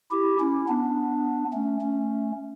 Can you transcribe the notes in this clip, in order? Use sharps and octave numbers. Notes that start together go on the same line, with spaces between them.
E4 G4
C#4 E4
B3 D4
A3 C#4
A3 C#4